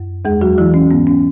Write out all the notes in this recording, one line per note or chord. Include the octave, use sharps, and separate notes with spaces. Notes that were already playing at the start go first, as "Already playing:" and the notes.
Already playing: F#2
E2 G#3 G#4
F#3 F#4
E3 F#3 E4
C#4
G#2 B3
C#4